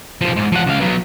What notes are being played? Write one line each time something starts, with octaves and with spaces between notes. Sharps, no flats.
B1 F3
G#2
F3 F#5
C#2 F5
F#3 B3